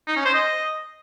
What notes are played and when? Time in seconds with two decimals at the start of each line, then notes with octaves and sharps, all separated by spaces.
0.08 D#4
0.16 C#4
0.25 C5
0.34 D#5